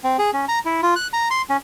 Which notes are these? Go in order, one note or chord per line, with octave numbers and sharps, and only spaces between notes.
C4
G#4
C#4
A#5
E4
F4
F#6
A#5
C6
C#4